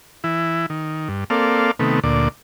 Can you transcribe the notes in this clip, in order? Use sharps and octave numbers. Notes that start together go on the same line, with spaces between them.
E3 E4
D#3
G2
A#3 C4 A4 D5 F5
C3 D#3 A3 B3
D2 A#2 D5